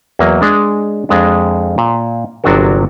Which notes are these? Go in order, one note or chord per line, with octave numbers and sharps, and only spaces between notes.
E2 F#3 A#3 D#5
G#3 D4
F2 G#3 D4
A#2
G1 C3 F#3 D4 F#4 A#4